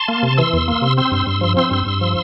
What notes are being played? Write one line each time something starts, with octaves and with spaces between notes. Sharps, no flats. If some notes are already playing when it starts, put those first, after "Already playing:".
Already playing: A5 C6
A#3
C3
E3 C6 E6
E2
A#3
C3
C4 C6 E6
G2
G2
F3
C4 C6 E6
G2
G2
F3